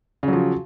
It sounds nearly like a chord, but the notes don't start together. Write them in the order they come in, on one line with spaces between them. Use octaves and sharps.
C#3 F#3 F3